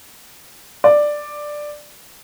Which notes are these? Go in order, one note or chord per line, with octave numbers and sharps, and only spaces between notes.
D5